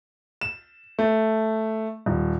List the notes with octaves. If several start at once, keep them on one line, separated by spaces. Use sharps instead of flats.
E7
A3
D#1